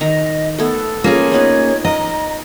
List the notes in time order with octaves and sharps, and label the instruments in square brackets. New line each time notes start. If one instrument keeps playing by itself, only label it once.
[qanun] D#3 A#5 [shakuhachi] D#5
[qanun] A3 B3 [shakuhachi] A4
[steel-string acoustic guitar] A#3 C#4 G#4 [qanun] F4
[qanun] B3 D#4 B4 [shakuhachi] C#5
[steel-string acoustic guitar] D#5 [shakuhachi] A#5